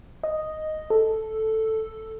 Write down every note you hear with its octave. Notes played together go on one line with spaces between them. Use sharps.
D#5
A4